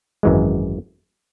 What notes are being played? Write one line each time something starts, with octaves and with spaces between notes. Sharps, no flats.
G#1 F#2 E3 G#3